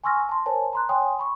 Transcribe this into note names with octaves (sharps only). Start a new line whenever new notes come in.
G#5 C6 C#6 E6 F6 A#6
A5 C6
A#4 C5 C#5 G#5 A5
A#5 C6 F#6
C#5 G5 G#5 C6 D#6
B5 C#6